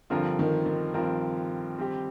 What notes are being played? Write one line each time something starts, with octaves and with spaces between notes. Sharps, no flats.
G2 D3 F3 C4 F4 A#4
D#3
D#3
G2 F3 C4 F4 A#4
G3 C4 G4